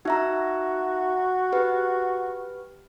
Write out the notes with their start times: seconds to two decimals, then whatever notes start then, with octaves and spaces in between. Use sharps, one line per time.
0.05 D#4 F#4 E5 A#5
1.52 G4 B4